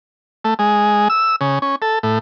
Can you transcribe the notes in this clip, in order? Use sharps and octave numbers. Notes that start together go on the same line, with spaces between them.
A3
G#3
E6
C#3
C#4
A4
A2